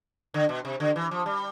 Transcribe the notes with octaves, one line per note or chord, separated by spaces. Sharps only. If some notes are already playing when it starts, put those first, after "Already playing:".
D3
B2
C3
D3
E3
F3
G3